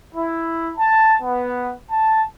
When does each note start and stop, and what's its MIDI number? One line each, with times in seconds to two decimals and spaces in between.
0.14 0.71 64
0.76 1.13 81
1.21 1.72 59
1.90 2.21 81